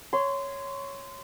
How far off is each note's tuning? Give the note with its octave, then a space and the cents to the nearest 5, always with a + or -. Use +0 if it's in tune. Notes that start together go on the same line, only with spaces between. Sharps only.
C#5 +0 C6 -20